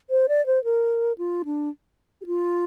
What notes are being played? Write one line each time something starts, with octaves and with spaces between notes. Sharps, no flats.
C5
D5
C5
A#4
F4
D4
G4
F4